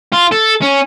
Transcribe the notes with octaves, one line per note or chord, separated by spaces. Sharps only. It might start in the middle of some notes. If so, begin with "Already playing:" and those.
F4
A4
C#4